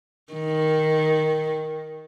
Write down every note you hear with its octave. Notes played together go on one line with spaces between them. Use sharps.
D#3